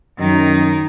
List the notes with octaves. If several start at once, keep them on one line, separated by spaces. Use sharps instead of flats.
F#2 D#3 D#4